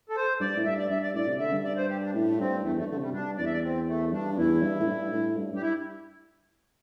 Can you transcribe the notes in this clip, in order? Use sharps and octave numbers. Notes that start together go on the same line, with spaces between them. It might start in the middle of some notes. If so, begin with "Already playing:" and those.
A4
C5
G2 D5
A2
G2 E5
D5
G2 E5
D5
A2 D5
C3
D3 E5
G2
D5
C5
G4
D4
A2
A3
G2 C4
E2 A3
A3
G2
D3 A3
C3 G3
G2 D4
E2 D5
E5
D5
C4
A3
G2 D4
E2 E4
G2
A2
G2
A2
G2
G2 G4
E4